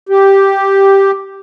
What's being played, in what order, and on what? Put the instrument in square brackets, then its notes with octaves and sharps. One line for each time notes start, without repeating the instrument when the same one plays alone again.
[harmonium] G4